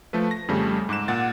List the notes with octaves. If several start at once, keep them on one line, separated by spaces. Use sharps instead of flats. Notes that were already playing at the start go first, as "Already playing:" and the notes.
F3 A3 A4 B4
A#6
F2 C#3 G3 A3
G#2 D6 F#6 E7
A#2 F#5 A6